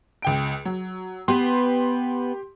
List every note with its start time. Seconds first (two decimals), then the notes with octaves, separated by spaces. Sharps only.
0.22 C#2 G5 D7
0.65 F#3
1.28 B3 G4 B4 C6